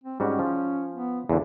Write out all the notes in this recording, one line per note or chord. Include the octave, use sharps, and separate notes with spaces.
C4
G#2 G3 C#4 F#4
F3
B3
E2 D3 A#3